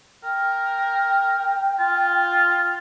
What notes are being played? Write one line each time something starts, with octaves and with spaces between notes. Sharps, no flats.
A#4 G5
F4